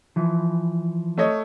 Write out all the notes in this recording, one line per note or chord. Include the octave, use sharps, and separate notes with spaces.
E3 F3
A3 C#5 D#5